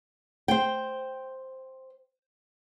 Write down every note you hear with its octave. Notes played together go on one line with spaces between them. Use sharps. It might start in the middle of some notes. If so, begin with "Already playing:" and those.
C5 G5